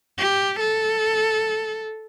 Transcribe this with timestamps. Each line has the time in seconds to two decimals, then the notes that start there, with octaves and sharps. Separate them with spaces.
0.18 G4
0.60 A4